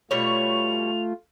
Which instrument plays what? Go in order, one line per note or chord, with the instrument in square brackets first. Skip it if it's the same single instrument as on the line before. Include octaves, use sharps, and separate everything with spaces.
[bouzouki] B2 G3 C#5 [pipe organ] A3 F4 [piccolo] F7